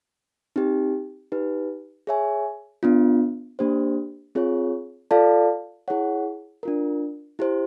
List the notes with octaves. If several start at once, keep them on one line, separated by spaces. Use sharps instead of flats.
C4 D#4 G4
D#4 G4 B4
G#4 C#5 E5 G#5
B3 D4 F4
A#3 D4 G4 C5
C4 F4 G#4 C#5
F4 A4 D5 F5 A5
E4 G#4 C#5 F#5
D4 F4 A#4
E4 G4 C5